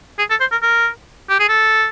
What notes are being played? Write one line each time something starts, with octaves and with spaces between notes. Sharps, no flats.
G#4
A4
C5
A#4
A#4
G4
G#4
A4